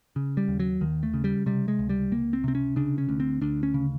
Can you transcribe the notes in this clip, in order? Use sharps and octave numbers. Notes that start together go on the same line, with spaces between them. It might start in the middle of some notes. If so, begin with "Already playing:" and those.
C#3
G3
D#2
F#3
D#2 D#3
A3
C#3
G3
C3 G3
G#3
C#2
G3
C#2 A#3
C4
C3 C4
C#4
C#3 D4
C#4
D2
C4
D2 D4
C#4
C#3